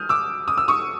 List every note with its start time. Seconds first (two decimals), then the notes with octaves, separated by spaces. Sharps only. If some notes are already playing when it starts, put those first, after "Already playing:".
Already playing: D#6 F6 G6
0.09 D6 E6
0.48 D#6
0.58 E6
0.68 C#6 D#6